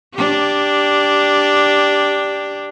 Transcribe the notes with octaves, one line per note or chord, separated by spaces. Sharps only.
D4 G4